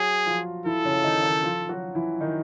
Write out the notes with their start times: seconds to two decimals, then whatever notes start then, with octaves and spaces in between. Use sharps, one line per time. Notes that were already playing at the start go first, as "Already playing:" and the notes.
Already playing: F#3 F#4 G#4
0.26 F3 F4
0.65 E3 E4 A4
0.85 C#3 C#4
1.04 D#3 D#4
1.23 D#3 D#4
1.43 F3 F4
1.69 F#3 F#4
1.95 E3 E4
2.21 D#3 D#4